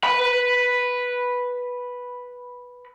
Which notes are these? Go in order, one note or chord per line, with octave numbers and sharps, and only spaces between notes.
B4 B5